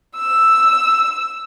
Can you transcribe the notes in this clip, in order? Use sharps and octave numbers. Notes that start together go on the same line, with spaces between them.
E6